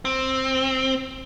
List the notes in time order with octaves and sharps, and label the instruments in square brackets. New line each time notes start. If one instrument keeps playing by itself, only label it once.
[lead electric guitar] C4